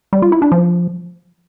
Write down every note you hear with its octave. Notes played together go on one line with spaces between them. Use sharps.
G3
F4
E4
D4
F3